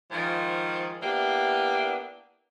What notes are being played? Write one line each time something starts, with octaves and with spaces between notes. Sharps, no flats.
G#2 D#3 F3
A#3 B3 D4 E4 G4